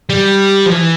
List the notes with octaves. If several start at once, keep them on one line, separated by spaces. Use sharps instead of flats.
G3
F3
E3